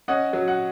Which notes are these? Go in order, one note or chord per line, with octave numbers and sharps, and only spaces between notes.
C#4 D#5 F#5
F#3
F#5